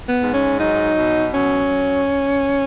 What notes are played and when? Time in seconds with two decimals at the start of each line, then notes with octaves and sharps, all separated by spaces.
0.09 B3
0.22 G#2
0.34 C#4
0.60 F#3 D#4
0.97 B2
1.35 F#3 C#4